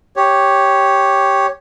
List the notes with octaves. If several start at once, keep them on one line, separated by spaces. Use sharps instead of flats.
G4 C#5